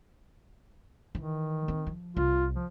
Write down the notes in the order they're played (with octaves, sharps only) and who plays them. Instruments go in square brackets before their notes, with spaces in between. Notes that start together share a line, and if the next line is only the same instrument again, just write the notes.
[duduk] D#3 [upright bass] E3
[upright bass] C4
F3
[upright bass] C2 [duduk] F4
[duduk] F3